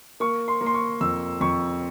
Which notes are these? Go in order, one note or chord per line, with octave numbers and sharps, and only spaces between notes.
A#3 C#6
C6
A#3
C6
C#6
F2 E6
F2 C#6